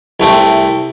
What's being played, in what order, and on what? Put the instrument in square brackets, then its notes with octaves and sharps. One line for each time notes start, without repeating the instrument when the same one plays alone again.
[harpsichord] C2 A3 C4